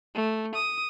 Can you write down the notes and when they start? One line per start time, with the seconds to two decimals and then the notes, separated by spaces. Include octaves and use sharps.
0.15 A3
0.55 D#6